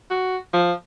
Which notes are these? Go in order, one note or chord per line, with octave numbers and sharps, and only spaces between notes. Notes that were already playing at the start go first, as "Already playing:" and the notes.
F#4
F3